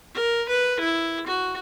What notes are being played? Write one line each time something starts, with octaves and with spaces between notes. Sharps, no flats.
A#4
B4
E4
F#4